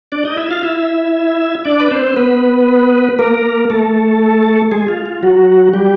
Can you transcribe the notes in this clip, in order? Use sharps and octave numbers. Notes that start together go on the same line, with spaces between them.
D4 D5
D#4 D#5
E4 E5
F4 F5
E4 E5
D4 D5
B4
C4 C5
B3 B4
A#3 A#4
A3 A4
G#3 G#4
F4
F4
F#3 F#4
G3 G4